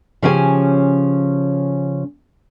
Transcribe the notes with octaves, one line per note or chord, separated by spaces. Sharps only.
C#3 F3 C#4 G4 E5 G#5